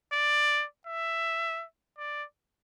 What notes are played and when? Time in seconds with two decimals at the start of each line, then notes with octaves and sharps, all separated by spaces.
0.13 D5
0.87 E5
1.98 D5